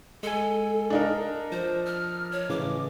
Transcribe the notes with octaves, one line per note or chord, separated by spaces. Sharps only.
G#3 A4 G#5
D4 D#4 A#4
F3 C5
F6
C#5
A2 C#3 E3 D6